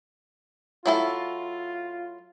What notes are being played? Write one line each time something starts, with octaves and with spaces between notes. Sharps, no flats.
F#3 E4 F4 A4